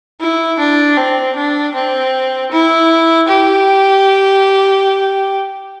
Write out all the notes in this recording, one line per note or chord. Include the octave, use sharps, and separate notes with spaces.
E4
D4
C4
D4
C4
E4
G4